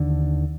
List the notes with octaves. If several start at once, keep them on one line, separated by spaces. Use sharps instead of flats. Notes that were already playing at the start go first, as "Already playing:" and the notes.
Already playing: D#2 D3